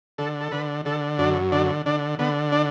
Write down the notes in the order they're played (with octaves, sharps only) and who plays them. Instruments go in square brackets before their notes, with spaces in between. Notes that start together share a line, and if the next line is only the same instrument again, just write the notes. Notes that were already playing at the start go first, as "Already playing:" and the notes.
[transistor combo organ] D3 A4
A4
D3 B4
D3 A4
F#2 D4
D3 D4
D3 D4
D3 B3
D4